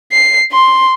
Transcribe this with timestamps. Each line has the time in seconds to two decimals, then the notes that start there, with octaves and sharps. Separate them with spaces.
0.12 C7
0.52 C6